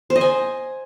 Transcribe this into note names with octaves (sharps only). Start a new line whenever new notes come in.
C5
D#5
G#5